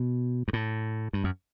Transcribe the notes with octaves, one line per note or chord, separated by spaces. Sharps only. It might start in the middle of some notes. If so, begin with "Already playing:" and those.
Already playing: B2
G2
A2
G2
F#2